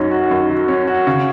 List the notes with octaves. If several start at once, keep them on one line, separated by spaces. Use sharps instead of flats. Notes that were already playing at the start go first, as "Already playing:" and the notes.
Already playing: F#2 F#3 C#4 D#4
F#4
F#2
F#3
C#4
F#4
C#3